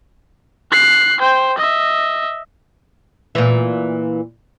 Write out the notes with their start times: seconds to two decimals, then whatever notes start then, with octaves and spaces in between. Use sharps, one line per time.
0.71 F#6 C7
1.20 C5 G5
1.58 D#5 E5
3.35 A#2 E3